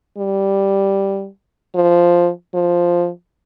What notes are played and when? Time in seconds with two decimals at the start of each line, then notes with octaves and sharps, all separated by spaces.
0.18 G3
1.75 F3
2.54 F3